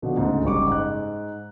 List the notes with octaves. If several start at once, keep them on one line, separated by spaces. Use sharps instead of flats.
B2 D3 F3
D2 G#2 C#3
F#1 G#2 G3 C#6 D6
G#2 F#6